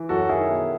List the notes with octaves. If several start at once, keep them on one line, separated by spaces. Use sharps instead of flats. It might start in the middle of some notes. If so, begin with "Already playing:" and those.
Already playing: E3
F#2 F#4 A4
D#3 E4 G#4
B2